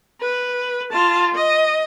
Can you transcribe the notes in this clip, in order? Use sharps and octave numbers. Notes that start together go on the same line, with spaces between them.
B4
F4 A5
D#5